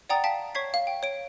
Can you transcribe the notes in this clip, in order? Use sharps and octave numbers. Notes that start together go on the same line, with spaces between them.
D5 F#5 G5 A#5 D#6 A6
F5 G5 A5 B6
C#5 C#6 G#6 B6 C7
F5
G5
C#5 D7